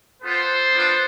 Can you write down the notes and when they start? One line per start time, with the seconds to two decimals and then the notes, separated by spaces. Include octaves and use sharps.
0.23 B3 F4 A4 C5
0.75 B3 D4 F4